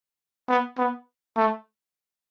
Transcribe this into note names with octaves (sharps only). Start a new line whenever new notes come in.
B3
B3
A3